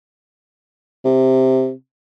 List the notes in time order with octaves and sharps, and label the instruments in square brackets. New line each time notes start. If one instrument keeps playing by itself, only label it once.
[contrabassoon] C3